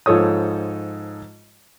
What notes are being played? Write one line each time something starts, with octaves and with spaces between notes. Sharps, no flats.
G#2 F3 A4 C#5 D#6